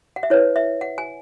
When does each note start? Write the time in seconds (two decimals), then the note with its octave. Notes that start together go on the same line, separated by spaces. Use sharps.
0.16 F#5
0.23 E5
0.30 E4 B4 C#5
0.56 E5
0.81 F#5
0.98 G#5